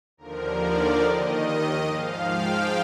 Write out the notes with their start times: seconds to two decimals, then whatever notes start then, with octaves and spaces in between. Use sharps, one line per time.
0.17 D#2 D3 F3 A#4
0.59 D5
1.02 D#2 D#3 D#5
1.85 G#2 F3 F5
2.27 G5